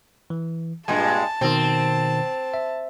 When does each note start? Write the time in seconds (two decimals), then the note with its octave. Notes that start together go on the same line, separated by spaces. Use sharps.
0.30 E3
0.88 G2 A#2 G#3 G#5 A5
1.41 B2 D#3 C4
2.54 E5